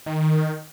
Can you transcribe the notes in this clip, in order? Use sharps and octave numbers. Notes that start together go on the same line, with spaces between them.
D#3